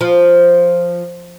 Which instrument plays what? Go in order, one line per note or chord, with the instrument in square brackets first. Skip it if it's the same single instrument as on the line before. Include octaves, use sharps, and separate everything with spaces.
[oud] F3